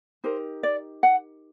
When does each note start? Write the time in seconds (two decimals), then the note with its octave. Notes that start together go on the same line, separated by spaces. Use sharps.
0.24 D#4 G4 A#4 C5
0.63 D5
1.03 F#5